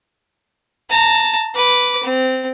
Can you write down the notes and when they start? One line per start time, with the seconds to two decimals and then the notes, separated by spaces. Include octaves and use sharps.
0.90 A5 A#5
1.55 B4 D6
2.04 C4